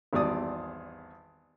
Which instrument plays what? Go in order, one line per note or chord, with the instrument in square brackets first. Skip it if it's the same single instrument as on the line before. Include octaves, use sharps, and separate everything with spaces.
[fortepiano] G#1 E2 G3 D5 D#6